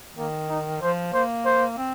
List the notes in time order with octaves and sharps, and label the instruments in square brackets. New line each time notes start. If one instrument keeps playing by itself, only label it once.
[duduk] D#3 [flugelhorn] A#3
[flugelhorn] D#4
[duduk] F3 [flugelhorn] C5
[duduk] A#3 [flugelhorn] C5
[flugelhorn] C5
[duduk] C4